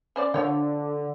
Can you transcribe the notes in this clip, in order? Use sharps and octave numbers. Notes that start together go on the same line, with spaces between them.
C#4 C5 D5
D3 F3 C#5 G5